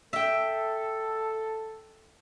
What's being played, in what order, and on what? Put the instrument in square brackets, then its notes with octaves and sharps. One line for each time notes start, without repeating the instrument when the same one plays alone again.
[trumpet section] A4 [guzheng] E5 G5